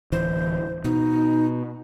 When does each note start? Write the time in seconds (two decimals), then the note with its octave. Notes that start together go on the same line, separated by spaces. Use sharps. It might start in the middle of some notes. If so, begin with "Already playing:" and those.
0.12 D1 E3 C5
0.84 B2 D#4